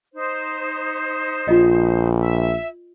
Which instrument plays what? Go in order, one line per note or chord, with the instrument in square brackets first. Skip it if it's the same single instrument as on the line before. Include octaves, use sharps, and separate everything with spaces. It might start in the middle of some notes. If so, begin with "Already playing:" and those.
[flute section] D#4 C5
[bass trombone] A#1 [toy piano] F4 D#5
[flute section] E5